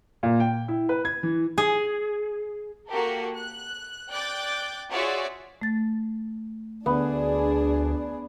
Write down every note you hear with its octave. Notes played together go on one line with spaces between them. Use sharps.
A#2
G5
E4
B4
G#6
E3
G#4
A#3 F#4 G4 A4 A#4
F#6
D5 G5 D6 F#6 G6 A6
F4 F#4 G#4 C#5 D5 E5
A3 A6
D2 B3 D4 G#4